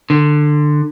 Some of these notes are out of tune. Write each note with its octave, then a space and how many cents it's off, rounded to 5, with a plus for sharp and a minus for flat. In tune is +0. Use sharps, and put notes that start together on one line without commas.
D3 +20